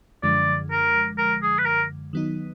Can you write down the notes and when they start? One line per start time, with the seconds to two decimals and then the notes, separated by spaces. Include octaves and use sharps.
0.23 F#2 D3 F3 G#3 D5
0.72 A#4
1.18 A#4
1.43 G#4
1.59 B4
1.66 A#4
2.13 D#3 F#3 B3 D#4